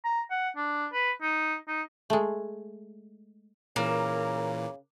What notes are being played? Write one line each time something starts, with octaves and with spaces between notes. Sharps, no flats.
A#5
F#5
D4
B4
D#4
D#4
G#3 A3
A#2 C#3 E3 A#3 A#4